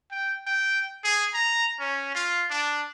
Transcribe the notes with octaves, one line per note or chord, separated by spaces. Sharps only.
G5
G5
G#4
A#5
C#4
F4
D4